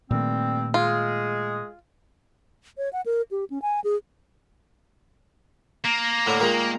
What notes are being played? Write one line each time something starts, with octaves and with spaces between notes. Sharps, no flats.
G2 A#2 D#3 G3 A3 C4
G#3 F4 G#4
C#5
F#5
A#4
G4
C#4
G#5
G#4
A#3 A#5
A2 D3 D4
A#2 D#3 G#3